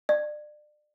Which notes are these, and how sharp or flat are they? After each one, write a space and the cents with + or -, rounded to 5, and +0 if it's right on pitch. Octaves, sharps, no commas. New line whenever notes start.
D5 +30